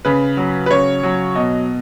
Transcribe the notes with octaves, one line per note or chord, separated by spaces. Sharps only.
C#3 B4
F#3
B4
C#3 C#5
F#3
B2 D#5